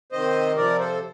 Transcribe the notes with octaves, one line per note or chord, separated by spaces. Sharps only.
C3 D#3 C5 D#5
C3 F3 A#4 D5
A4 C5